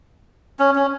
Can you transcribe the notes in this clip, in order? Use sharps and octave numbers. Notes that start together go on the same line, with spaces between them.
C#4
C#4